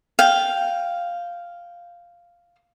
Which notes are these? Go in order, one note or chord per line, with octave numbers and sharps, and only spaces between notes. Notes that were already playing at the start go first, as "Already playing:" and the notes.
F5 G5